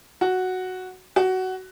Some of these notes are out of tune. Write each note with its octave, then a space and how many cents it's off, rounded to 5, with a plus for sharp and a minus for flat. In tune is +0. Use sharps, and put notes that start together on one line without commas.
F#4 +0
F#4 +15